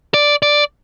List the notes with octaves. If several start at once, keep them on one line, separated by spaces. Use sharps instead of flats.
D5
D5